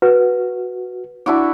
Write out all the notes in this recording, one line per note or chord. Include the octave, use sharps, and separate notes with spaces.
F#4 B4
D4 E4 F#4 D6